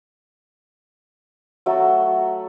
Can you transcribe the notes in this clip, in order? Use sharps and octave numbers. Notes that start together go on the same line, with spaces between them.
F#3 A3 F#4 A4